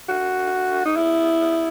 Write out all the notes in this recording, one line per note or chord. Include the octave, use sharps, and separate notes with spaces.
F#4
D#4
E4